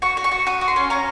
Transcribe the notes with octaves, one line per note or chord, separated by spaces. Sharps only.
F#4 C#6
F#4
C#6
F#4
F#4 D#6
F#4
C6
C#4
C#4 A#5